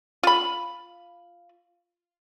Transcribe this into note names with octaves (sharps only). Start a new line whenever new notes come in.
F4 B5